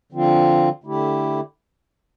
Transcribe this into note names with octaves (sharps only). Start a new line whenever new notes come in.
D3 F3 C4 F4
D3 A3 E4 G4